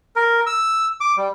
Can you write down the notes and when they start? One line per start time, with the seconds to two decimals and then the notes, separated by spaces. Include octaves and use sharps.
0.16 A#4
0.46 E6
1.01 D6
1.17 G3